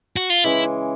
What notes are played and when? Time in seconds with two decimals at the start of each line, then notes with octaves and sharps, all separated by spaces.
0.16 F#4
0.30 F4
0.44 C#3 E3 G#3 E4